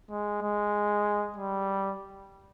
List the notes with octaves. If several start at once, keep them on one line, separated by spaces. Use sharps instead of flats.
G#3
G#3
G3